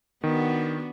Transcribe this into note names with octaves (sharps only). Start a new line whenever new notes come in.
D#3 B3 D4 F#4